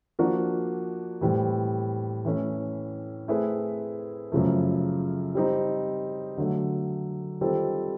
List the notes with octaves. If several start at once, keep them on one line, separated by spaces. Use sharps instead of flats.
F3 A#3 D4 F#4
A2 E3 G3 C4
E3 A3 C#4 E4
A3 C4 E4 G#4 B4
F#2 C#3 F3 A3
G3 C4 D#4
D3 F#3 A3
D#3 G3 C4 F4 A4